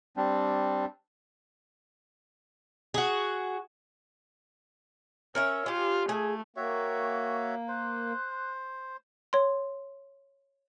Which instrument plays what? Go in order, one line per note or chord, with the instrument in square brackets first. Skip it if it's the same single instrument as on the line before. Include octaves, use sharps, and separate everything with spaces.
[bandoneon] G3 C4 D4
[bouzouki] F#4 G#4
[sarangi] C#4 [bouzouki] A#4 C#5 E5
[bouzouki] C#4 G4 [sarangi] F4
[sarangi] A3 [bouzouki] G#4
[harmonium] A#3 [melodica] F#4 C#5 E5 [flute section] G5 C#6
[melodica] C5 [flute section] C6 F#6
[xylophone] C#5 C6